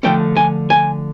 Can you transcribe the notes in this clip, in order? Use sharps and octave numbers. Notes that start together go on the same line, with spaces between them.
D3 F3 A3 C#4 G5
G#5
G#5